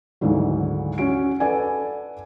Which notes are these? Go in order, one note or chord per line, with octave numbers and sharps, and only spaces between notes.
G#1 D2 G#2 D3 E3 F#3
C#4 F#4 D7
A4 B4 D5 F#5 G#5